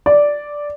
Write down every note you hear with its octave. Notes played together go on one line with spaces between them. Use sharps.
D5